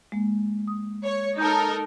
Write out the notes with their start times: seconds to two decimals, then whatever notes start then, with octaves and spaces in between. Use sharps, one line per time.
0.12 G#3 A#3
0.67 D#6
1.03 C#5
1.38 D#4 A4 A#4 G6